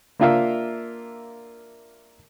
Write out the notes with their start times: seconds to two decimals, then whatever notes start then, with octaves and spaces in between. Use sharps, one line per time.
0.20 A#3 D4 F4 A#4 E5 F5